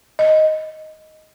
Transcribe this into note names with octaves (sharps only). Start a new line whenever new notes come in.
D#5